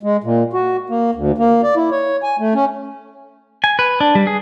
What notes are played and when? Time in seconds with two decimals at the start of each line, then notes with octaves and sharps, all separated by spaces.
0.03 G#3
0.24 A#2
0.53 F#4
0.90 A#3
1.15 D2
1.38 A#3
1.63 D5
1.76 E4
1.91 C#5
2.23 G#5
2.39 A3
2.54 C#4
3.64 G#5
3.79 B4
4.00 D4
4.15 G3
4.27 G#4